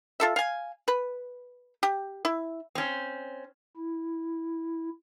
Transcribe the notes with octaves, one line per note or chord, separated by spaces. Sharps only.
F4 A4 E5
F5 G#5
B4
G4
E4
C4 C#4
E4